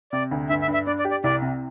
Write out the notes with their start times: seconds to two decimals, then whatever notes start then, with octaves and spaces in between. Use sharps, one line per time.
0.12 C3 D5
0.31 D2
0.49 G2 E5
0.62 E5
0.68 G2
0.74 E5
0.87 D4 D5
0.99 D5
1.05 G4
1.11 D5
1.24 C2 D5
1.42 C3